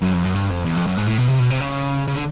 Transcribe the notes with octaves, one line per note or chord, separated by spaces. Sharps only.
F#2
F2
F#2
G2
F2
E2
F2
F#2
G#2
A2
B2
C3
B2
C3
C#3
C#3
D3